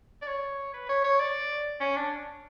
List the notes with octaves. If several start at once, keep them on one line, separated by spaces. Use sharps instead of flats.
D5
C#5
B4
C#5
C#5
D5
C#4
D4